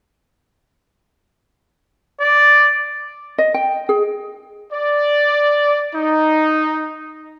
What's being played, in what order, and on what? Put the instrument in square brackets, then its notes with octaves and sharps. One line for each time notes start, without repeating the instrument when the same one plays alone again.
[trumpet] D5
[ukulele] D#5
G5
G#4
[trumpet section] D5
D#4